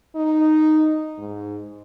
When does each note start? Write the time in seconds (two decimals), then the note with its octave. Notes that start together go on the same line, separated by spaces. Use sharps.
0.16 D#4
1.18 G#2